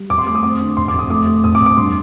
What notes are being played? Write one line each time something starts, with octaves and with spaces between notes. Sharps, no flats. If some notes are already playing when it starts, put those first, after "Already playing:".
Already playing: G3
F2 D6
C6
A3 D6
D#6
C4 D6
D3
F1 C6
D6
F2
D#6
A3 D6
A3
F2 D#6
D6
F2
D6
G2 C6